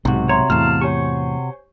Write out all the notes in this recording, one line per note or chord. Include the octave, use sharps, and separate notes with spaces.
B1 G#2 C3 F#4
C#5 E5 A#5 C6
E2 A2 F5 A5 F6
G4 C5 C#5 G#5 C#6